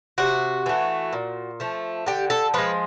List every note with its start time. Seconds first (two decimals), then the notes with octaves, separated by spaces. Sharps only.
0.18 C3 F#4
0.66 E3 A3
1.13 A#2
1.60 F3 A3
2.06 D3 G4
2.30 A4
2.54 F3 G#3 B4